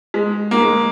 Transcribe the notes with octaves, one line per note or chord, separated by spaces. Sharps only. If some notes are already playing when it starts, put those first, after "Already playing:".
G#3
A#3
G#3